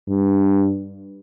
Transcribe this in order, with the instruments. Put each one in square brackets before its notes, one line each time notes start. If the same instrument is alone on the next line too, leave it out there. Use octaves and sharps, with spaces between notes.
[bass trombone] G2